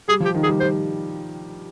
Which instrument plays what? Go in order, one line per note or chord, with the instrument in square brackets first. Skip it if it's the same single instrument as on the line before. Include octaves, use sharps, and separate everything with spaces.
[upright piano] G3 [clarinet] G#4
[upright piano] F3 [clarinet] G4
[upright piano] D#3
[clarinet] G#4
[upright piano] G3
[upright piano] G3 [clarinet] C5